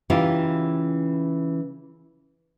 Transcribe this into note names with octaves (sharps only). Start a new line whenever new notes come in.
C#3 E3 C#4 D#4 F4 G4